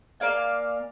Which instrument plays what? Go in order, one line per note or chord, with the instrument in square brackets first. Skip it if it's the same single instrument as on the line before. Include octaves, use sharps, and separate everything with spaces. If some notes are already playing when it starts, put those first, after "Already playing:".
[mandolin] A#3 D5 F5 G#5